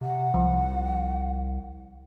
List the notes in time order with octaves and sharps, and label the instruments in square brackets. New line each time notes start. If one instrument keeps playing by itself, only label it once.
[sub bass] C3 [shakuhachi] F#5
[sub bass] C2 [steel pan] F3